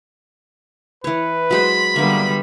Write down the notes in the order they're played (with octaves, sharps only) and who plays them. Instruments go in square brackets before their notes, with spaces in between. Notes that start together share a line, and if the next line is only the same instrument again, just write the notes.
[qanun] E3 C#5 [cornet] B4
[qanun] F#3 G#3 C5 [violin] B5
[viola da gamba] D3 G3 [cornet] A#3 [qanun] B3 E5